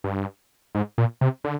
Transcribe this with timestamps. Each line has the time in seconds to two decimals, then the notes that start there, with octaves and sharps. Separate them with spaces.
0.04 G2
0.75 G#2
0.98 A#2
1.21 C3
1.44 D3